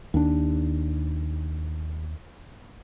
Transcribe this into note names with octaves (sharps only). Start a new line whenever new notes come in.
D#2 D4